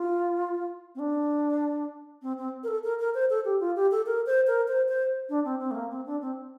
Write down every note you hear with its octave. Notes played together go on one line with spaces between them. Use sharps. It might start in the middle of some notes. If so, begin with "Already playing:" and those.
Already playing: F4
C4
D4
C4
C4
A#4
A4
A#4
A#4
C5
A4
G4
F4
G4
A4
A#4
C5
A#4
C5
C5
D4
C4
C4
A3
A#3
C4
D4
C4